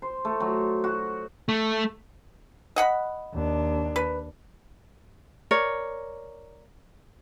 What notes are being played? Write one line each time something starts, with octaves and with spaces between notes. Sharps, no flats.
C5
A3
F#3
F#4
A3
D#5 F#5 B5
D#2 D4
B4
A#4 C#5 D5